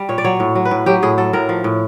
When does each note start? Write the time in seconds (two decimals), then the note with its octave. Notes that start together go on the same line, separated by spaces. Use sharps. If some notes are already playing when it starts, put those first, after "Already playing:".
Already playing: G3
0.09 A#2 C#5
0.18 D5
0.24 F#3 C#5
0.40 A2
0.55 F#3
0.65 B4
0.71 A2
0.86 F#3 G4
1.03 A2 G#4
1.17 F#3 A4
1.33 A2 A#4
1.49 F3
1.64 A2